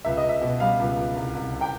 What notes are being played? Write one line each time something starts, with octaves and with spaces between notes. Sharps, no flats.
C#2 E5
D#5
C#2
E5
B2
G3 F5
C#2
C#2
C2
C2
C3
G5